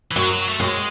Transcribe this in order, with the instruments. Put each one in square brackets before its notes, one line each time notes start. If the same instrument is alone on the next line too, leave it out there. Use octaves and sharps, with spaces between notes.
[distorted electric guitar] E3
[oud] F#2 [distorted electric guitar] F#3
[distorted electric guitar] A3
[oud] F#2 [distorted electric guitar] G#3